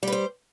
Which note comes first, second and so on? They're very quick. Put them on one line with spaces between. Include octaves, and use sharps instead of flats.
G3 B4 C5